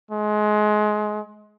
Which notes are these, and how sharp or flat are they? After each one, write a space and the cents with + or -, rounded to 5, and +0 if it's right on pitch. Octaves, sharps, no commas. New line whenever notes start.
G#3 +25